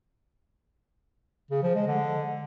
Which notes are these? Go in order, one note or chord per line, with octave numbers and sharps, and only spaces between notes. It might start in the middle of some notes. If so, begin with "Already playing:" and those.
C#3
F3
G#3
D3